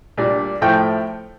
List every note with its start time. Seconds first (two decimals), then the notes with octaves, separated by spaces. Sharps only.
0.18 A#2 G3 D4
0.61 A2 F3 A3 G5